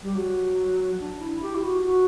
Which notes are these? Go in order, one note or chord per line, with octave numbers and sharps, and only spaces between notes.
G3
F#3
D4
E4
G4
E4
F#4
F#4